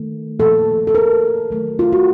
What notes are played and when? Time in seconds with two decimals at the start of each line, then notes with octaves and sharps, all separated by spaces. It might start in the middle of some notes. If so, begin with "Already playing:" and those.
Already playing: D#3 A3
0.39 A#2 F3 A#3 A4
0.87 A4
0.95 A#4
1.50 D#3 F#3 A3
1.79 F4
1.92 F#4